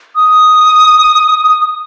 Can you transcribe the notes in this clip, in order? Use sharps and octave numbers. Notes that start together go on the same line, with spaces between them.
D#6